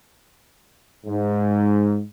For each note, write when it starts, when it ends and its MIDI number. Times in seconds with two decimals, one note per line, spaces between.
1.06 2.01 44